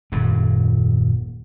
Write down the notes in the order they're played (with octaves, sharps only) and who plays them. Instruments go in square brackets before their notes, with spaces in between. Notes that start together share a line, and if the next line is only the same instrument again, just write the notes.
[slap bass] D#1 F#2